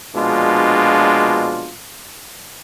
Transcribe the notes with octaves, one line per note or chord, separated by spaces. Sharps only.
A#1 B2 G#3 D4 F4